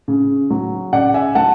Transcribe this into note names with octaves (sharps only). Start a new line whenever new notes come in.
C#3
F#3
C#3 D5 F#5
E5 G#5
F#3 F#5 A5